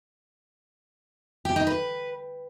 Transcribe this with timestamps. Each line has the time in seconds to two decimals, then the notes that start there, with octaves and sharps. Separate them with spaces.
1.45 G4
1.56 D#4
1.67 B4